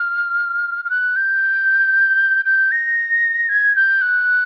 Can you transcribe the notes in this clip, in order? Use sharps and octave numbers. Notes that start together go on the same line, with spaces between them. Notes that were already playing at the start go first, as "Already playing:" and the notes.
Already playing: F6
F6
F#6
G6
G6
A#6
G#6
G6
F#6